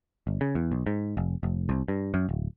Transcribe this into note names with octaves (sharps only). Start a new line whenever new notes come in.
G1
C#3
E2
B1
G#2
F1
F1
C2
G2
F#2
D1